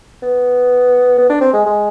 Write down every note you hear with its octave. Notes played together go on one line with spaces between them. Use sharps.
B3
B3
D4
C4
G#3
G#3